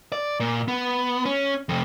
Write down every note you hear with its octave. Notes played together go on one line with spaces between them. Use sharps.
D5
A#2
B3
C#4
F2 C3